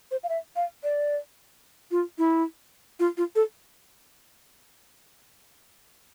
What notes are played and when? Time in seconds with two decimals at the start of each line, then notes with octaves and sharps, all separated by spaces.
0.11 C5
0.23 F5
0.29 E5
0.56 F5
0.84 D5
1.91 F4
2.18 E4
3.00 F4
3.18 F4
3.36 A4